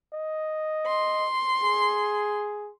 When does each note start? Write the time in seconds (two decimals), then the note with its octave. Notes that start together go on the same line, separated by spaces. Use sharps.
0.14 D#5
0.87 C6
1.63 G#4